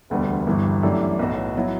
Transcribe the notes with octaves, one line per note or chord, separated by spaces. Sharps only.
E1 D2 D3 G3 B3
G1 G2 E3
F#2 E3 A3 D4 G4
B1 A2 F#3 B3 F#4
F#3 B3 E4